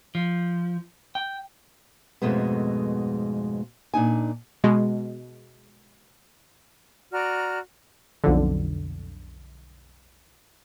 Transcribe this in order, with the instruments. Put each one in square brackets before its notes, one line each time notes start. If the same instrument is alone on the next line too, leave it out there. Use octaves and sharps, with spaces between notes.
[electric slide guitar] F3
G5
[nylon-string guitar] F2 G#2 B2 G#3 A3 B3
A#2 D4 D#4 G#5
[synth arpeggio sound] B2 G#3
[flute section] F#4 D5 A#5 F6
[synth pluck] B1 F2 D3